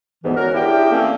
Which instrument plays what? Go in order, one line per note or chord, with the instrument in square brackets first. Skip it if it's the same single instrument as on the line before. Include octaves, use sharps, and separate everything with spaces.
[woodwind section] D2 G#2 E3 B3
C#4 F#4 A#4
D4 E4 G4 G#4 G5
E3 A3 A#3 C4 C#4